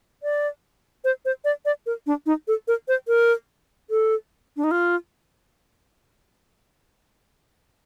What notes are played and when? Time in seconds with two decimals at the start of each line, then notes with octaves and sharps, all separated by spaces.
0.23 D5
1.04 C5
1.25 C5
1.44 D5
1.65 D5
1.86 A#4
2.06 D4
2.26 D#4
2.48 A4
2.68 A#4
2.88 C5
3.08 A#4
3.90 A4
4.57 D4
4.64 D#4
4.71 F4